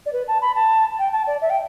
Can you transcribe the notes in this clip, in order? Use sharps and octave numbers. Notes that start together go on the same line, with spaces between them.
D5
B4
A5
B5
A5
G5
A5
D5
E5
G5